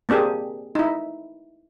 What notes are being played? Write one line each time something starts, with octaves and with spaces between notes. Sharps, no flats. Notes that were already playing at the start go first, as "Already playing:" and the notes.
A#3 C4 D4 G4 G#4
D#4 E4